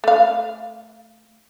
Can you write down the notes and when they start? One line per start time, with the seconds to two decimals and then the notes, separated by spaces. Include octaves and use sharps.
0.04 A3 F5